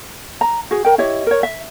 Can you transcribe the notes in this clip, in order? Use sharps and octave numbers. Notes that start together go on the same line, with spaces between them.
A#5
F#4 G#4
A#4 G5
E4 G4 C#5 D#5
A#4 C#5
E5